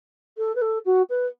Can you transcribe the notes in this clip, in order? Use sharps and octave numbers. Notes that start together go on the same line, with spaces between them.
A4
B4
A4
F#4
B4